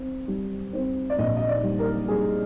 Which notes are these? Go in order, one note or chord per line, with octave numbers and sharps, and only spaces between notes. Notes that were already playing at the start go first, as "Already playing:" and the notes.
Already playing: C4
G3
C4
D5
A#1 D#5
D#5
D5
G3
A#4
G3 G#4